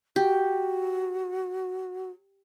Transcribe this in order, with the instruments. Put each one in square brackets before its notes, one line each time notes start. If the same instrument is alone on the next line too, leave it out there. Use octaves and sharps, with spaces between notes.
[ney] F#4 [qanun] G4